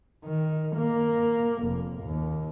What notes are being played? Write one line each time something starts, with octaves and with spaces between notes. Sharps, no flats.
D#3
A#3
F1
D#2